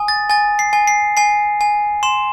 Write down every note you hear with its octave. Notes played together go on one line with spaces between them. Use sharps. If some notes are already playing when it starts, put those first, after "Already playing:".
Already playing: G#5 D#6
A6
G#5 A6
C7
G#5
C7
G#5 C7
G#5
C6 E7